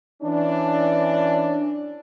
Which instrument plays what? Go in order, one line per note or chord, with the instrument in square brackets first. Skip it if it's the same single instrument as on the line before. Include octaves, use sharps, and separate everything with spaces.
[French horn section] E3 C#4 D4